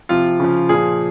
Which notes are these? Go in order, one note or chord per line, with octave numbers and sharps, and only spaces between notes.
C3 F3 F4
C#3 F3
A#2 G#4
F3